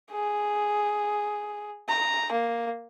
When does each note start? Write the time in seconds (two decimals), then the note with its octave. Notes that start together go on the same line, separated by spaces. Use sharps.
0.11 G#4
1.88 A#5
2.32 A#3